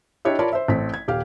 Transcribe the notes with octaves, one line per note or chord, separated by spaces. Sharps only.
D4 E4 G4 C#5 D#5 E5
F4 A#4 C#5 D5 A5 B5
C5 E5
A1 A3 C4 B6
G#6
D#1 G4 F5